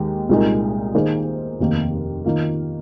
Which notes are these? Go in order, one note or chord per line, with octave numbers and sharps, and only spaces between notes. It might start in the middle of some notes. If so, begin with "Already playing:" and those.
Already playing: D#2 D#3 G#3
C2 A#2 G#3 D#4 A#4
D#3 A#3 D#4 G#4 C5
F1 D#2 D#3 A#3
D#3 A#3 F4 A#4